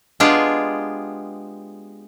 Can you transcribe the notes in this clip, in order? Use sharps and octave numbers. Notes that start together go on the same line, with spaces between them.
G#3 B3 D4 F4 G4 G#4